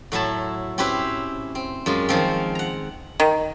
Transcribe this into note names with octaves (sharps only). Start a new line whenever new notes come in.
A2 F#3 E4 A5
C4 C#4 E4 G4 B4 C5
C4
F#2 G#3 F4
D#3 F3 C4
F#5 A#5
D#3